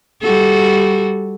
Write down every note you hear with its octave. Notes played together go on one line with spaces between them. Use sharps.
G3 F#4 A4